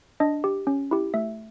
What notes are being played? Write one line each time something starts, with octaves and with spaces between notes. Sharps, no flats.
D4 D#5
G4
C#4
E4 G4
A3 E5